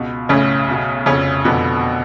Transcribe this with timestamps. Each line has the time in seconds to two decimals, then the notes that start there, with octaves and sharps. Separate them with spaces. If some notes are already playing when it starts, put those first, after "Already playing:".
Already playing: C#2 B2
0.29 B1 A2 C#3 C#4
0.68 B1 B2
1.06 F1 F2 C#3 C#4
1.44 F1 F2 B2 D3 B3